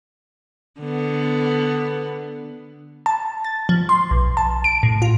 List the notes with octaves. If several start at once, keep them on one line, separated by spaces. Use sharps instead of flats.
D3 B3
A5
A6
F3
C6
B1
A5
D7
A2
F4